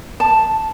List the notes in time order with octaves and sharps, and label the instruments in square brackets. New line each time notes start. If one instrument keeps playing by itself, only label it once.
[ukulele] A5